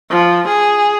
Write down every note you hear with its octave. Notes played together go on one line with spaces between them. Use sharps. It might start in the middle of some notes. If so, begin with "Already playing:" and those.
F3
G#4